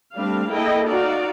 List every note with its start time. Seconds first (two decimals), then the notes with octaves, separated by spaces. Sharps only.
0.16 G3 A3 C4 D4 F5
0.51 A#3 E4 G#4 A4 D#5 G5
0.89 D#4 F#4 D5 F5